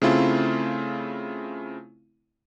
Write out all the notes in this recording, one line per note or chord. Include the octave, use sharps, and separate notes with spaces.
C#3 A3 C4 E4 F4